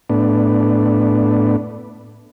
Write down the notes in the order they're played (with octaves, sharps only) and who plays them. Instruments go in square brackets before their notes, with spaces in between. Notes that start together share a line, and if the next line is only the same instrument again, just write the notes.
[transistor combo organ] A2 B3 D4